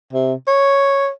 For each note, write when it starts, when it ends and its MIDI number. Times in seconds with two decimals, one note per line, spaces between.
0.13 0.34 48
0.47 1.09 73